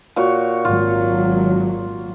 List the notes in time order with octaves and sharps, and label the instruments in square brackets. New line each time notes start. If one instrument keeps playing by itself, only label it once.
[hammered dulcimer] A#2 F#4 C#5
[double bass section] G#1 F#3 [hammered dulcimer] F4